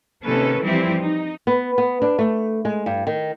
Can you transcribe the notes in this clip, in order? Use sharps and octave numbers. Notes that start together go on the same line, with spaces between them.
C3 D#3 A#3 C#4 A4 B4
E3 F3 G3 C4 E4 G4
D#4
B3
B3
D4
A3
G#3
G2
D#3